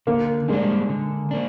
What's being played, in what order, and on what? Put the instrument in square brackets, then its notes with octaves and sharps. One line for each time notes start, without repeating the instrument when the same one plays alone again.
[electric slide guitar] D3 [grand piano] A#3
[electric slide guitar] G3 A#3 D4 [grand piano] G#3
[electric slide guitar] D3
A#3 D4